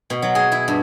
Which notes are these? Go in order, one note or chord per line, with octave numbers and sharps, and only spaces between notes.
B2
F#3
G#4
E4
G2